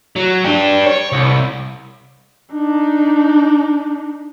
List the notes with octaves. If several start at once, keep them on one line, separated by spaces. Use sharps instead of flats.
F#3
D4 G4
C#5
C2
D4 D#4